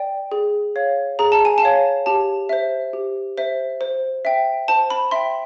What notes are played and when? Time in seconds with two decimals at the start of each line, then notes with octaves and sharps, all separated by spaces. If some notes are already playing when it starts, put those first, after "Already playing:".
Already playing: D5 G5
0.32 G#4
0.76 C#5 F5
1.19 G#4 A#5
1.32 A5
1.45 G#5
1.58 A5
1.63 C#5 F5
2.06 G4 A5
2.49 C5 E5
2.93 G4
3.38 C5 E5
3.81 C5
4.25 E5 G5
4.68 C5 A5
4.90 B5
5.11 E5 G5 C6